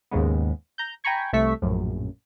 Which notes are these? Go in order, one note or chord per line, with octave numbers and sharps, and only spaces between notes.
D#2 G#2 C#3 G#3 B3
A#5 G6
G5 G#5 A#5 B5 C#6 G#6
C2 C3 A3 E5 C#6 B6
A#1 F#2 A2